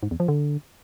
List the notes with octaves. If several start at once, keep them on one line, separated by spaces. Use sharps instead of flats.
G#2
E2
F3
D3